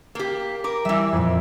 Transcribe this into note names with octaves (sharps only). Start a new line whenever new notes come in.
A#3 G4
A#4 D6 D7
E3 G3 E5
F2 A#2